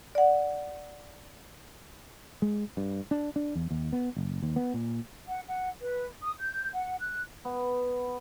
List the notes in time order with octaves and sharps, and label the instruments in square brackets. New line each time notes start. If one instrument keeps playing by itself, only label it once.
[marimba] D5 F#5
[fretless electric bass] G#3
G2
D4
D4
E2
D#2
B3
F#1
D#2
B3
A#2
[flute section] F#5
F#5
B4
D#6
G6
F#5
F#6
[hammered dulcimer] B3